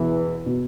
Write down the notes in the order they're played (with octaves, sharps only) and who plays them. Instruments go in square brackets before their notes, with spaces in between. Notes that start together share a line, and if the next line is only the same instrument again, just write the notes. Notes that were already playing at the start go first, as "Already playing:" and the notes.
Already playing: [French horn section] E2 E3 [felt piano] B2 B3 F#4
[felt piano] B2 B3 F#4